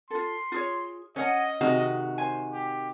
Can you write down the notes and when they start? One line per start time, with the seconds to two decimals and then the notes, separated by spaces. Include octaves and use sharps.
0.11 F4 A4 C6
0.52 F4 G#4 C#5
1.16 C#4 C#5 D#5 F#5
1.61 C3 D#3 F#4 G#4
2.18 C5 G#5
2.52 G4